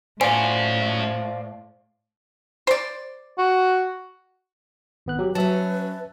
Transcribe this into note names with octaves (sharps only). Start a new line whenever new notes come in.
A2 C#4 F#4 C5 D5 F5 G#5
C5 D5
F#4
G#1 B3 F#6
F#3 G4
F#3 C#4 B4 E5 A5